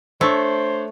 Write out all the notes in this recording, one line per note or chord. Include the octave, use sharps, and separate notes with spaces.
A3 D4 C5 C#5